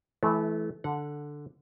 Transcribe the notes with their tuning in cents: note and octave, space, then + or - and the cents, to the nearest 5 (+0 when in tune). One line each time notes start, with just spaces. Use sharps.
E3 +0 A3 -30
D3 +0 F#5 -20